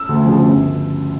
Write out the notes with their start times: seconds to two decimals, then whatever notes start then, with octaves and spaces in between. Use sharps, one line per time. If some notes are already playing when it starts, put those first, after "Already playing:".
Already playing: E6
0.09 D2
0.25 C#3 F3
0.43 G1